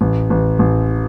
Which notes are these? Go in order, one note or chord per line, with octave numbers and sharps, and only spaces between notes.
A1
A1
A1